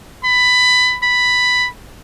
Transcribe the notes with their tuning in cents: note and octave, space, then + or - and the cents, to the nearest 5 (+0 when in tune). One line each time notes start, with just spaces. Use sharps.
B5 +15
B5 +5